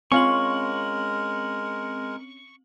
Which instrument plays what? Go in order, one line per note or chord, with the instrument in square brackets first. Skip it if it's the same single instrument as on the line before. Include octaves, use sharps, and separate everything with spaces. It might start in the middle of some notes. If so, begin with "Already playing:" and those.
[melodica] G#3 A#4 [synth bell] C4 F#7 [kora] C#4 F4 [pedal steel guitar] C#6